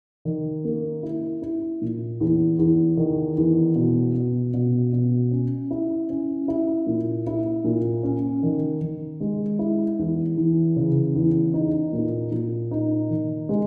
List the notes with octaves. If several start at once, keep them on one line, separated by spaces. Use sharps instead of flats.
D#3
A#3
E4
E4
A#2
E2
E2
D#3
E2
B2
B2
B2
B2
C#4
E4
C#4
E4
A#2
E4
A#2
C#4
D#3
D#3
G#3
E4
E2
E3
C#3
E2
D#4
A#2
A#2
D#4
D#3
G#3